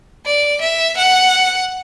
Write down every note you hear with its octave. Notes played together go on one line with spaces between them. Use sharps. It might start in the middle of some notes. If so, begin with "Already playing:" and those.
D5
E5
F#5